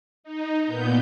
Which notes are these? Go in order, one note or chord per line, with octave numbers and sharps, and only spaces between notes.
D#4
A#2 B3 G6